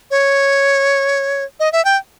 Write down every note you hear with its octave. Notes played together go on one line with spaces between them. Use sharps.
C#5
D#5
E5
G5